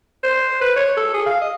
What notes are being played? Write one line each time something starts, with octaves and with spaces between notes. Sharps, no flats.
C5
B4
C#5
A4
G#4
F5
D#5